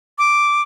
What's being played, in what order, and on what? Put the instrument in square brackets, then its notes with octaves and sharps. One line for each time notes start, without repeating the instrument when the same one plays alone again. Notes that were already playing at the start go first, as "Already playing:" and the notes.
[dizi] D6